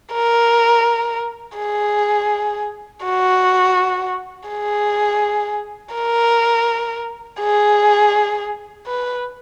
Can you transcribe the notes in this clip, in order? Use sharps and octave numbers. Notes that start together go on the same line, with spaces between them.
A#4
G#4
F#4
G#4
A#4
G#4
B4